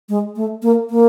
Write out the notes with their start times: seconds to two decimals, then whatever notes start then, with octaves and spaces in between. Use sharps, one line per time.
0.09 G#3
0.36 A3
0.62 A#3
0.90 A#3